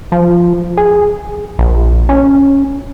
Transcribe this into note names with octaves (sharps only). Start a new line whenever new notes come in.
F3
G#4
A#1
C#4